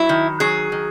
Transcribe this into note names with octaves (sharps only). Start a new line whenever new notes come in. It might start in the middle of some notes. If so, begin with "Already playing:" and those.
Already playing: F#3 E4
D#3
F#3 G#4
D#3